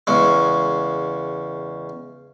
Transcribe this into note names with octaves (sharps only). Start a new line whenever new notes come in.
E2 C#3 G#3